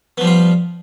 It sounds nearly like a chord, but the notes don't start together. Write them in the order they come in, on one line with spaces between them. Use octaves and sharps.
B3 F3 G3 F4